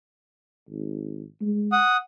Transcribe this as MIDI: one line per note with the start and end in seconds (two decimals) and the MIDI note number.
0.69 1.24 32
1.41 1.80 56
1.72 1.97 78
1.72 1.97 87